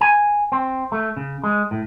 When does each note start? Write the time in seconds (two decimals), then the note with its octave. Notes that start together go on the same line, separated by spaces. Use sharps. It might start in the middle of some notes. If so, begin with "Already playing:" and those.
0.01 G#5
0.52 C4
0.92 A3
1.17 C#3
1.44 G#3
1.71 A2